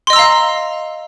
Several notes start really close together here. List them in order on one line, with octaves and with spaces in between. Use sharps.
C6 D#5 E6 A#5 F5